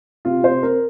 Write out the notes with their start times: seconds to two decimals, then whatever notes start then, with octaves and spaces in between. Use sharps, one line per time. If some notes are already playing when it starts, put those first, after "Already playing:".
0.25 C3 F4
0.43 C3 C5
0.63 C4 A#4